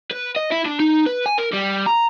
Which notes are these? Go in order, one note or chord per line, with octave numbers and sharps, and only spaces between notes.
B4
D#5
E4
D4
D#4
B4
G#5
A#4
G3
A#5